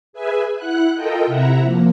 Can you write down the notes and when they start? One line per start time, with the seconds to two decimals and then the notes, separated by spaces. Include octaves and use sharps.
0.13 G#4 B4 E5 G#5
0.57 E4 F#5 F#6
0.94 F4 A4 A#4 D#5 G5
1.26 C3 E4 E5 F#5 A#5
1.60 F3 A#3